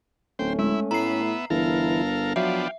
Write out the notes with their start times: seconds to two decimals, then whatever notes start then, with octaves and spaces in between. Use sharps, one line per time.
0.39 D1 A3 C#4 C5 G5
0.59 G#3 E4
0.91 A2 B3 E5 A#5 C7
1.50 G1 E3 E4 A4 A#4 F5
2.36 F3 F#3 B3 D4 E5 F5 G5